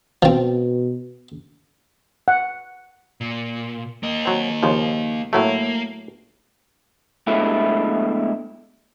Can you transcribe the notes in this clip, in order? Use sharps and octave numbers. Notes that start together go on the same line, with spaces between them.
B2 F3 C4
F#5
A#2
A#3 D#5
F#3 C4
D#2 C#3 F3
A2 F#3 A3 A#3
B1 B2 D3 G#3 A3 E4